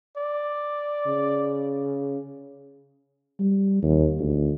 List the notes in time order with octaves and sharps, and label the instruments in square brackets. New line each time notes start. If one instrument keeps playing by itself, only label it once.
[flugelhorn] D5
[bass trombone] C#3
[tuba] G3
D#2
D2